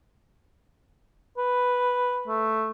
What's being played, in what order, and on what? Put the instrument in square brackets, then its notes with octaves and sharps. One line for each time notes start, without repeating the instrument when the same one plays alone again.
[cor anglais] B4
A3